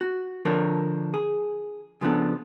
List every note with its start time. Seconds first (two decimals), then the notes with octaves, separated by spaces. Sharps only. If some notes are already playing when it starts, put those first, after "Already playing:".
0.01 F#4
0.45 D3 F3 D4 A4 A#4 C#5
1.14 G#4
2.01 C#3 F3 B3 D4 A4